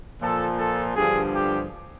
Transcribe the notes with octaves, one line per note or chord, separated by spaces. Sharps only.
A#2 F3 A4
A4
G2 D3 F3 G#4
G4